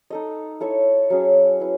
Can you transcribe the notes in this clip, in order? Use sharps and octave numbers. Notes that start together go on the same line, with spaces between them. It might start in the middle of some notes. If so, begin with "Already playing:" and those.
D#4 A4 D#5
E4 A4 C#5 E5
F#3 C#4 G#4
E4 B4